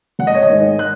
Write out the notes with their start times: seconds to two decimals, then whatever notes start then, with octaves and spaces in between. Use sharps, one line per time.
0.19 G#1 F#5
0.27 D#5
0.35 C#5
0.43 D#5
0.49 G#2 D#3 G#3
0.79 F#6